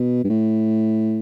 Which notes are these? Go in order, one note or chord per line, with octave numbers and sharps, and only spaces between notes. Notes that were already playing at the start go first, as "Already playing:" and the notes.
Already playing: B2
G2
A2